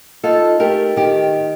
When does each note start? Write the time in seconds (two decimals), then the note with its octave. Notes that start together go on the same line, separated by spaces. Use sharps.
0.24 D#4 F4 A4
0.60 A3 G4 A#4
0.96 D#3 G4